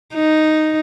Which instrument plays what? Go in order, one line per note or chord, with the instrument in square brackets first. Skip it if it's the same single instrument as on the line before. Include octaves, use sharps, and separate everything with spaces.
[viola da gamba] D#4